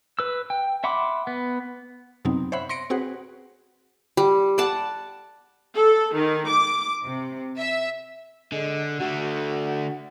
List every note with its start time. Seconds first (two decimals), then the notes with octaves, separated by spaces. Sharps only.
0.19 B4 E6
0.50 G5
0.84 E5 F#5 B5 C6 D6
1.27 B3
2.25 F#2 C3 F#3 B3 C4 D#4
2.52 C5 C#5 E5 F#5 B5
2.69 C6 A#6 C#7 D7
2.90 C4 F#4 G#4 B4 C5 F#5
4.17 G3
4.58 D5 F#5 A5
5.75 A4
6.14 D#3
6.47 D6
7.03 C3
7.59 E5
8.52 D3 G#3
9.01 D3 A3 F#4